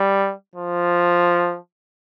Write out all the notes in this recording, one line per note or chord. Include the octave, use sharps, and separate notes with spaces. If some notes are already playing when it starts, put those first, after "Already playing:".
Already playing: G3
F3